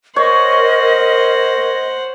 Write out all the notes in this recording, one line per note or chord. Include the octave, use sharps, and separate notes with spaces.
A#4 C5 C#5 D#5 F#5